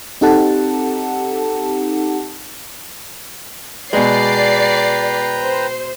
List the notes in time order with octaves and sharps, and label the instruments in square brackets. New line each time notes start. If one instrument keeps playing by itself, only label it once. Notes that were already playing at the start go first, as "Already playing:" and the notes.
[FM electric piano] C4 D#4 G4 A4 F#5 A5
[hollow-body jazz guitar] B2 G#3 [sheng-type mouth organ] B4 G5 A#5 [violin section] D5 C7
[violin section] C5